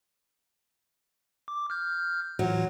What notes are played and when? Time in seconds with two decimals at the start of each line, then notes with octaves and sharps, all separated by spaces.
1.48 D6
1.70 F6 G6
2.39 A2 E3 F#3 F4